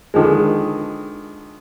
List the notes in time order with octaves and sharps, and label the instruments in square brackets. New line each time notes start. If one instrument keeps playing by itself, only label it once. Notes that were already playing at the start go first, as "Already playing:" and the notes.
[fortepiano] D3 D#3 F3 G#3